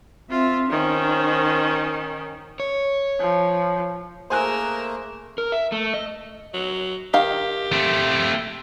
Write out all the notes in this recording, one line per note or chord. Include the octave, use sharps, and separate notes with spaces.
C4 F4 E5
D#3 C#4 D#4 C5
C#5
F3
A3 A#3 G#4 A#4 C5 G#5 E6 F#6
A#4
E5
A3
D#5
F#3
D#3 G4 F5
A3 C4